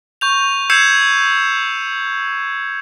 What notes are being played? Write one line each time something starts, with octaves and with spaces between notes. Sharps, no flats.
C#6 G6 F7
E6 G6 G#6 C7 C#7 E7